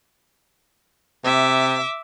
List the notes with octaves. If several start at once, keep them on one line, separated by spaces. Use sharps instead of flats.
C3 E5 D6